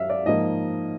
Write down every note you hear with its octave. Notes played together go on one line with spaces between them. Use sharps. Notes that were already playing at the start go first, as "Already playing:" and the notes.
Already playing: F#2 E5 F5
D5
G#2 F3 A#3 D#5